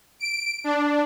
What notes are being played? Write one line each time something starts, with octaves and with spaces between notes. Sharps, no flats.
D7
D4